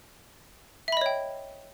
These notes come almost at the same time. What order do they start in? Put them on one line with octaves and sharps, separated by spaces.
E5 B5 D#5 C#5 G5